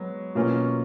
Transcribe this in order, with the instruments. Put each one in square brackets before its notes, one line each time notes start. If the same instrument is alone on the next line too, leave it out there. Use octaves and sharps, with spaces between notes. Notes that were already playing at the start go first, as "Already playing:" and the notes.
Already playing: [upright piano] F#3 [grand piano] G#3 B3
[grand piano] B2 A#3 C#4 F4